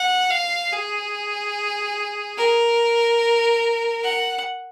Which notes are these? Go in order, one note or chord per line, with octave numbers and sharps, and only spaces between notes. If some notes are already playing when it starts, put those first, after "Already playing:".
Already playing: F#5
F5
G#4
A#4
F#5